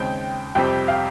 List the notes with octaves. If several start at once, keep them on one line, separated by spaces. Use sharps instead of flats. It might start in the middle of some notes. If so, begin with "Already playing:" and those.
Already playing: D#2 C#3 G#3 C4 G5
F2 C3 G3 C4 G5
F5